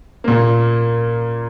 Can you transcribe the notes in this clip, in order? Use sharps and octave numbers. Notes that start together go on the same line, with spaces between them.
A#2 A#3